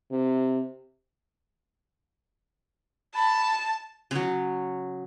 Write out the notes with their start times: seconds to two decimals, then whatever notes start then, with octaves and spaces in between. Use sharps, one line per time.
0.11 C3
3.15 A5 B5
4.11 C#3 F#3